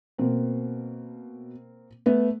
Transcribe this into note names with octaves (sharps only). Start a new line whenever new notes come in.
B2 A#3 C4
A3 B3